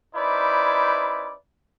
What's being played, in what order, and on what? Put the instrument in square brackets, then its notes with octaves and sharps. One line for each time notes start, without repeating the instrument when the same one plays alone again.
[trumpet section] C#4 D#4 E4 B4 C5 D5